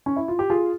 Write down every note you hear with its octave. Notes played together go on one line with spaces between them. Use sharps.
C#4
E4
F4
G4
F4 G#4